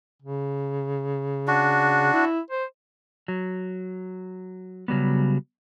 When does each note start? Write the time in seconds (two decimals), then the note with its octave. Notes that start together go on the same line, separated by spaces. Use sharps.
0.22 C#3
1.48 D4 F#4
2.13 E4
2.51 C5
3.28 F#3
4.88 C#3 F#3 G3 B3